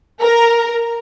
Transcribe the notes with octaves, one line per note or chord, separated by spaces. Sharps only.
A#4